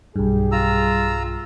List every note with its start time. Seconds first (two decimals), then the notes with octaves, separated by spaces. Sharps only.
0.16 B1 G2 G3 G4 G#4
0.52 F4 A#5 E6